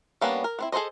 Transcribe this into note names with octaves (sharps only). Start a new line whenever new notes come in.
G3 A#3 B3 C#4 D4
A#4
B3 C4 E4
G#4 A4 B4 C5 D#5